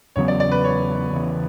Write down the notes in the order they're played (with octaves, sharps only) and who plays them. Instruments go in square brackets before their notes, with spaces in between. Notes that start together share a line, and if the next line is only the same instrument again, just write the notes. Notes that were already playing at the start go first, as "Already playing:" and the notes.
[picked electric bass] E2 C#3 F#3 B3 [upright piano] C#5
[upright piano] D5
D5
B4
C#5
[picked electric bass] E2 C#3 E3 B3